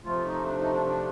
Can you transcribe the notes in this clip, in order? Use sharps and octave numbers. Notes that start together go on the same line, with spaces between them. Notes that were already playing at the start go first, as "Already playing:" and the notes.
C3 F3 A3 F4
D#4
D4
D#4
D4
D4